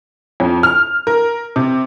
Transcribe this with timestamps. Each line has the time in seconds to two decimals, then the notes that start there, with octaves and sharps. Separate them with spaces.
0.40 F2
0.63 F6
1.07 A#4
1.56 C3